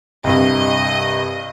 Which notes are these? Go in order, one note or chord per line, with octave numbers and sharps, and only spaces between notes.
C2 G2 D#5